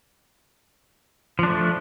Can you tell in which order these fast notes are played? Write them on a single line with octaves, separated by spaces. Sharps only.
F3 D4 A3